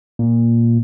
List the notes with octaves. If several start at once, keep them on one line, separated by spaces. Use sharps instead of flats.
A#2